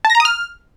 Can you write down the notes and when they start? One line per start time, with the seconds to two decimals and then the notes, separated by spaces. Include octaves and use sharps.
0.05 A5
0.10 A#6
0.15 A#5
0.20 D#6
0.25 F6